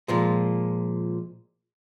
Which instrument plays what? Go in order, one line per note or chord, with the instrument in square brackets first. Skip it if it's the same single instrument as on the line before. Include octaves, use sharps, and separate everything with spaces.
[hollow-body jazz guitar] A#2 F3 G#3